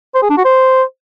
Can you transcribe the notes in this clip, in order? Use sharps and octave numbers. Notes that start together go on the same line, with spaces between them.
C5
G#4
D4
F#4
C5